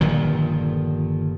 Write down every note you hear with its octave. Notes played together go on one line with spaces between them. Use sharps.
G1 A#2 D#3 F3